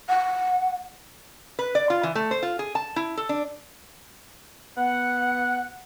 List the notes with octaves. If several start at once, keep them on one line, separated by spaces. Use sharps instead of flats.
F#5
B4
D5
F4
E3
A3
C5
F4
G#4
A5
E4
A4
D4
B3 F#5